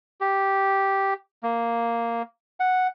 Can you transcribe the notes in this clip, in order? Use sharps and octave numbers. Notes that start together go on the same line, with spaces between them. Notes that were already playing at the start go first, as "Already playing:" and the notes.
G4
A#3
F#5